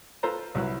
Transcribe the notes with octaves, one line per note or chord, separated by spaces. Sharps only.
F4 A4 B4 C5 A5 A#5
C2 F#3 E4 B4